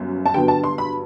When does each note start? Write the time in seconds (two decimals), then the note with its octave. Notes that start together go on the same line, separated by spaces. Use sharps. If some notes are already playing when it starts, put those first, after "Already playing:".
Already playing: G1 F#2 F#3
0.26 A5
0.34 G2 D3 F#3 B3 G5
0.48 A5
0.64 C6
0.78 B5